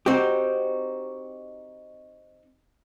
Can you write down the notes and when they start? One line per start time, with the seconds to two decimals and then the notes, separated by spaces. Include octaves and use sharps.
0.06 C4 D#4 F#4 G4